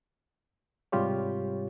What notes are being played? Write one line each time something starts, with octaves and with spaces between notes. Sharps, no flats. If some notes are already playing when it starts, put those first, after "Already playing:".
G#2 C3 G3 F4 G4 C#5